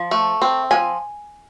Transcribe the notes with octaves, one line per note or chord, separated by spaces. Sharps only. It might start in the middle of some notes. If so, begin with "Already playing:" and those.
Already playing: F3
A3
C4
F3 G#5